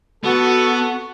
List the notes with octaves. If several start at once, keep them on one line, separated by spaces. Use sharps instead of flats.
B3 F#4 A4